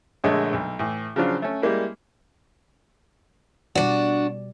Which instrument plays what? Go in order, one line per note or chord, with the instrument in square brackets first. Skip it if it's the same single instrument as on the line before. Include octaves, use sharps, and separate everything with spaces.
[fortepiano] A#1 D3 G#3 A3 C#5 D#5
B1
A2 E3
C#3 F3 F#3 D4 F4
A3 C#4
G3 G#3 A#3 E4
[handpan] B2 G3 D5 [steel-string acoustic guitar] D4 F#4